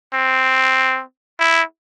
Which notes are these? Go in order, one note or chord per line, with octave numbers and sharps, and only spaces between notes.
C4
E4